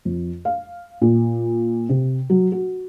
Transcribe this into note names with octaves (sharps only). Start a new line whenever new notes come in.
F2
F5
A#2
C3
F#3
F#4